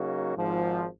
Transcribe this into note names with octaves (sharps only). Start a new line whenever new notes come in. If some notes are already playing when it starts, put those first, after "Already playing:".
Already playing: C#3 F#3 A#3 D#4 F#4
G#1 G#2 F3